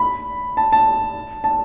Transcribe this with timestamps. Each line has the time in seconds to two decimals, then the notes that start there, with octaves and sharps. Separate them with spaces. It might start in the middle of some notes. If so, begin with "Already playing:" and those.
Already playing: B5
0.57 A5
0.72 A5
1.44 A5